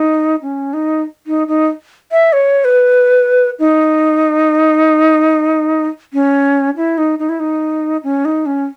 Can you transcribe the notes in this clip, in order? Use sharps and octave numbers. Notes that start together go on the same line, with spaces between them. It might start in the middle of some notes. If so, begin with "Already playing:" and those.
Already playing: D#4
C#4
D#4
D#4
D#4
E5
C#5
B4
D#4
C#4
E4
D#4
D#4
E4
D#4
C#4
D#4
C#4